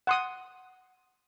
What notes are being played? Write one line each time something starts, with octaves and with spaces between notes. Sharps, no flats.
F#5 C6 D#6